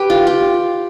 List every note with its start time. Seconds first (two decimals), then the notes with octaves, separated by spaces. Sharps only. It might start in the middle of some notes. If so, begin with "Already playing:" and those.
Already playing: G4 B4
0.10 F4
0.27 G4